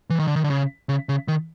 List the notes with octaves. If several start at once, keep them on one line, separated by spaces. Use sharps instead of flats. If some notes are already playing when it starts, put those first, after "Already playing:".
E3
D#3
D3
D#3
D3
C#3
C#3
C#3
D#3